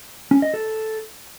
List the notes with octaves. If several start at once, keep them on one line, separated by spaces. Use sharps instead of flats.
C#4
D#5
A4